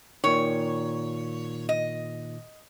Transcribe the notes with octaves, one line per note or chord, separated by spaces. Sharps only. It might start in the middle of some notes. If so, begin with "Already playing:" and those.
A#2 D#3 C#5
D#5